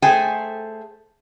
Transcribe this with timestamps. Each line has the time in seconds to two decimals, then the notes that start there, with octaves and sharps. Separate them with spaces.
0.02 A3 G#4 C5 G5 G#5